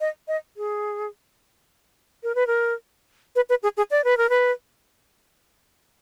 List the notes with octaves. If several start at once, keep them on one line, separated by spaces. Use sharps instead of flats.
D#5
D#5
G#4
A#4
B4
A#4
B4
B4
G#4
G#4
D5
B4
A#4
B4